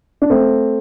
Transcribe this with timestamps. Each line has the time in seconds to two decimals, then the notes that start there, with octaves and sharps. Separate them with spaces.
0.22 D4
0.30 A3 C4